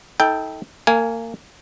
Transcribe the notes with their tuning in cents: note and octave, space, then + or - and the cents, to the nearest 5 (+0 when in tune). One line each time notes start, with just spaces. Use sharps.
D#4 +40 A4 +0 G5 +0
A#3 -30 F5 +0 G#5 +0